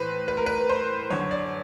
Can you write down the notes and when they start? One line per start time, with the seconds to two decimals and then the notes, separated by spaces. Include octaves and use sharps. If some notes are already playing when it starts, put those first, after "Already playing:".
Already playing: A2 E3 B4 C5
0.28 B4
0.37 A#4
0.46 B4
0.69 C5
1.10 F#2 D3 C#5
1.31 D5